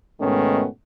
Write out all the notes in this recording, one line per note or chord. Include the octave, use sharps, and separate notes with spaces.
G#2 B2 D#3 A3 B3 C#4